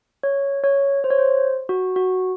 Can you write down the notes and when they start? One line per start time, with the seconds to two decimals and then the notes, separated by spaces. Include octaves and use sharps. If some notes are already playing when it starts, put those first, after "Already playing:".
0.23 C#5
0.64 C#5
1.04 C5
1.10 C#5
1.18 C5
1.69 F#4
1.96 F#4